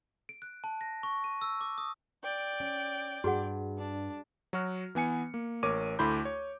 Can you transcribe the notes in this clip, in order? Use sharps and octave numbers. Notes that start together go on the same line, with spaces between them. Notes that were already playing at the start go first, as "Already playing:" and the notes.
D7
F#6
A5
A#6
C#6
D#7
E6
D6
D#6
D5 G5
C#4
G2 F#4 G#4 F#5
D4
F#3 F#4 F6
E3 B3 G#5 C#7
A#3
A1 A#4 C#5 D6 D#7
D2 A3 E4 B5 C6 G6
C#5